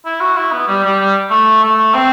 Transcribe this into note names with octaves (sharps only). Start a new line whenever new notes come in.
E4
F#4
E4
B3
G3
G3
G3
A3
A3
C4